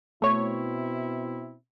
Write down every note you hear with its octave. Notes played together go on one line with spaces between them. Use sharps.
B2 A3 C4 E4 C#5